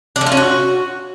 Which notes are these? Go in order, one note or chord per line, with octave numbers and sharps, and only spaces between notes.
D4
A3
F4
C#4
F#4